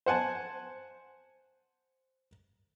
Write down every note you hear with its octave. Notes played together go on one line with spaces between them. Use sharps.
C5 F#5 G#5 A5